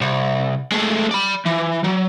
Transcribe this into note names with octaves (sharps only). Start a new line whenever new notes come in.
C2
G#3 A3
D5 B5
E3
F#3